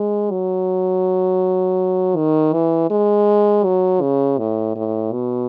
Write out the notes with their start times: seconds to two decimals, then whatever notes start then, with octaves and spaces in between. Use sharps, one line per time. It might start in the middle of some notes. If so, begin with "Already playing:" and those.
Already playing: G#3
0.31 F#3
2.16 D#3
2.53 E3
2.90 G#3
3.64 F#3
4.01 C#3
4.38 A2
4.75 A2
5.13 B2